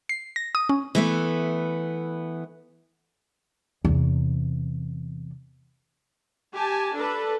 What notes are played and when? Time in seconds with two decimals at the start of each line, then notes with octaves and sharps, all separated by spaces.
0.09 C7
0.36 A#6
0.55 D#6
0.69 C#4
0.95 E3 A3 B3
3.85 E2 C3
6.54 G4 G#5 A5
6.96 D4 A4 B4